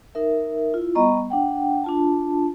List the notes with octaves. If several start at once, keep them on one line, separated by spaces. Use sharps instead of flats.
D#4 A#4 E5
E4 F4
G3 B3 D#5 A#5 C#6
D4 F#5 G5
D4 F4 A5